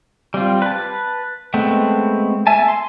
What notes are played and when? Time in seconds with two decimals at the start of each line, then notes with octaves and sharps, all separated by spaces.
0.34 G3 C4 F4
0.62 B4 A5
1.54 G#3 A3 B3 C4
2.47 E5 G#5 A5
2.68 C6